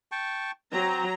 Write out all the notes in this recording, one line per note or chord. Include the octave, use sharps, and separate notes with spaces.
G5 A5 C#6
F#3 C4 A#5